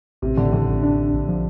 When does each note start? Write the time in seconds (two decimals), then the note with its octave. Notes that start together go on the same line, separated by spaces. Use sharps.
0.22 A1 C3
0.37 A2 D3
0.53 A2 D3
0.68 A1
0.83 D4
0.98 A1
1.13 A#1
1.28 F3